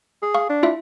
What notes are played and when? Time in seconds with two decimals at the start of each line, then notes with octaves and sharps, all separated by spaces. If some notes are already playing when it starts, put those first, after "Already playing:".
0.22 G#4
0.34 F5 C#6
0.49 D4
0.63 E4 F4 E5